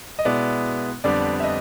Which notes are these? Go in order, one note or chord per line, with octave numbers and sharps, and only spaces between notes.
D#5
B2 G#3 B3 E4 D5
F2 D3 G3 B3 D4 D5
E5
D#5